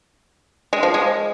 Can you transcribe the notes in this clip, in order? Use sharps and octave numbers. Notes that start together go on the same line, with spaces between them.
G#3
F3
G#3